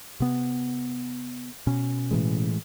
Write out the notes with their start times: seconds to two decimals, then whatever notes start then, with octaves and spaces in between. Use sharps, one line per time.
0.20 C3 B3
1.67 B2 C#4
2.11 A2 E3 G#3